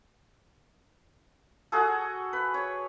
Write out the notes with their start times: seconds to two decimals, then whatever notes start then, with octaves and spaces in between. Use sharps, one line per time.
1.72 F#4 G#4 A4
2.33 B4
2.54 C#5